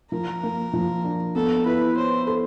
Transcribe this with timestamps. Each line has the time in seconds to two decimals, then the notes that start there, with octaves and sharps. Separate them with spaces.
0.11 F3 A#4
0.43 A#3
0.73 F3
1.04 D4
1.35 B3 A4
1.65 E4 B4
1.96 C5 C#5
2.27 A4